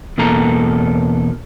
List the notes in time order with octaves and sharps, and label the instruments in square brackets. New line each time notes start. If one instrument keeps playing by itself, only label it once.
[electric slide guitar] E2 B2 A#3 A4 A#5